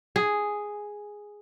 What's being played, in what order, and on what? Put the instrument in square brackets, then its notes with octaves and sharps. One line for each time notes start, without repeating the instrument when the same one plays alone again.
[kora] G#4